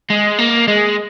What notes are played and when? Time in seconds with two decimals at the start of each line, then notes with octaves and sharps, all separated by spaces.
0.10 G#3
0.39 A#3
0.68 G#3